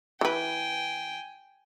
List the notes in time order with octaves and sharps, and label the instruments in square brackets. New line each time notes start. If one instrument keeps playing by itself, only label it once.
[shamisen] E3 B4 [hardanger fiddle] G5 G#5